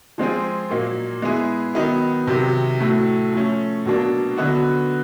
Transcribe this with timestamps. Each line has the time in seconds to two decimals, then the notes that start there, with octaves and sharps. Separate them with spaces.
0.18 F3 G#3 C4 F4 G#4
0.71 A#2 F#3 A#3 D#4
1.22 G#3 B3 E4 G#4
1.75 D#3 F#3 B3 D#4
2.27 C3 D#3 F#3
2.80 A2 F#3 A3
3.33 F3 A3 C#4
3.85 B2 F#3 A#3 D4
4.37 D3 F#3 B3 D#4 F#4